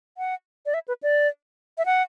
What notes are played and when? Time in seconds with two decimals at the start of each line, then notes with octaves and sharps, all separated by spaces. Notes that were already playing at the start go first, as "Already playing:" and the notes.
0.18 F#5
0.66 D5
0.74 E5
0.88 B4
1.03 D5
1.78 E5
1.86 F#5